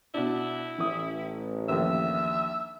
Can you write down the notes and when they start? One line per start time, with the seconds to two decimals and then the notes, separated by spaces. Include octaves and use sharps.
0.14 B2 D4 E4
0.78 A1 E3 D#6
1.69 A#1 D#2 E5